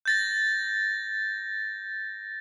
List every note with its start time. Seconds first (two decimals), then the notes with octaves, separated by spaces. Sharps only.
0.05 G6 A6 A#6